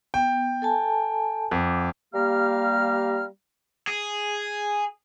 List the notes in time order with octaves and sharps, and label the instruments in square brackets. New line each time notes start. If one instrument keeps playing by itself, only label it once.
[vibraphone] B3 [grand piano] G5
[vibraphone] A4 G#5 A5
[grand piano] F2 [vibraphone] F#5 D6
[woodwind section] G3 A#3 G4 F5 A#5 F6
[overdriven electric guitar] G#4